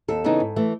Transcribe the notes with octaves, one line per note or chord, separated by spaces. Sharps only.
D#2 A4
C#3 E3 B3 D#4
G#2
E3 A3